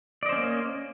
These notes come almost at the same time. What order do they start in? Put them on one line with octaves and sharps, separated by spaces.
D5 D#5 C5 C#4 A#3